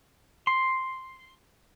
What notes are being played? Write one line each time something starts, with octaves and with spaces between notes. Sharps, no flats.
C6